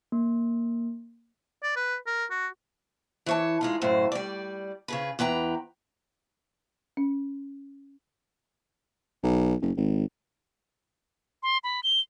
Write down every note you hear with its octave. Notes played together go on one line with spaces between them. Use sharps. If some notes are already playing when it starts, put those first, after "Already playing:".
A#3
D5
B4
A#4
F#4
E3 C#5 A5
G#3 D#4 F4
F#2 A2 C#3 C5
G3 D5
C#3 G#4 B4
E2 B4 G5 A#5
C#4
B1
F#1
G#1
C6
B5
G7